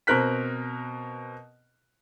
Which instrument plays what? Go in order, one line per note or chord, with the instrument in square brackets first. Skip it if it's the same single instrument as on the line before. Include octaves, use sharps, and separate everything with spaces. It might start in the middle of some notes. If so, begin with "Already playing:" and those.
[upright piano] B2 C4 A#4 F#6 B6